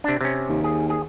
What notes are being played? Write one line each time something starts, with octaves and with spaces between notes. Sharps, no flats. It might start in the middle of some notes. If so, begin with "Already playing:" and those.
C3 D4
C3 C#4
D#2
G#4
G#4